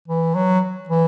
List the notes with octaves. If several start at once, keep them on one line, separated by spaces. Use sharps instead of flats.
E3
F#3
E3